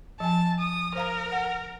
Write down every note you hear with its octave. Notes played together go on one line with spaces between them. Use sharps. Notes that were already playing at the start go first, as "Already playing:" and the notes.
F3 G#5 A5
D#6
A#4 C5 F5 A#5
F#5